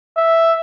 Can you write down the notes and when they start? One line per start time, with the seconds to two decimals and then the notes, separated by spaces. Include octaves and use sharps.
0.16 E5